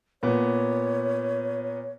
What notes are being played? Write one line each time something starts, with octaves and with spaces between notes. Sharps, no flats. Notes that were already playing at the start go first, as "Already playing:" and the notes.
A#2 B3 C#5